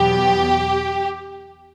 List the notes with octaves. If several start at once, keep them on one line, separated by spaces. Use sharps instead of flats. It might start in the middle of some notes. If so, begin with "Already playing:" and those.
Already playing: E2 B2 F#3 B3 G4